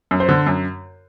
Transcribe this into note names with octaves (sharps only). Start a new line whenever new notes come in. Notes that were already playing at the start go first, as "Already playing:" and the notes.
F#2
C5
D3
F#2